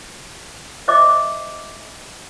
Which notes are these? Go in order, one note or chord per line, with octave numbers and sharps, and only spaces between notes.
C5 D#5 E5 D6